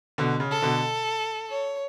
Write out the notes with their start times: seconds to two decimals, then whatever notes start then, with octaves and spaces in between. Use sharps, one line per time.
0.18 B2 D3
0.40 C#3
0.51 A4
0.62 B2 D3
1.49 C#5